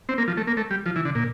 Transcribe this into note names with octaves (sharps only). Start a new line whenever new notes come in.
C4
A#3
F3
A3
A#3
A3
G3
F3
E3
D3
A#2